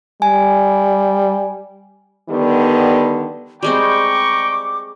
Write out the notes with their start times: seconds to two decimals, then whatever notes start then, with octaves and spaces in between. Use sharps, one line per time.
0.22 G3 G#5
2.30 D3 D#3 G3 B3
3.63 G3 G#3 C4 G5 A#5 C#6 D6